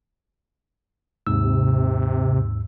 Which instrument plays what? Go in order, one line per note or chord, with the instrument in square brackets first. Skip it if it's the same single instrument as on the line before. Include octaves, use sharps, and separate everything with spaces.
[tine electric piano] D#2 G#2 E6 [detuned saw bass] C3